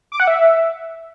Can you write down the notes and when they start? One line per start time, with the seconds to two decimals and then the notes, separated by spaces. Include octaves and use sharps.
0.12 D6
0.20 F#5
0.27 E5